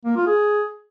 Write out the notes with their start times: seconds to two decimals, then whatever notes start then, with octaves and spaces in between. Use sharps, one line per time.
0.05 A#3
0.16 F4
0.27 G#4